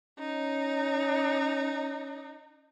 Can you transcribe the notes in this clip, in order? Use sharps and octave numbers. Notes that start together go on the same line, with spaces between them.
C#4 D#4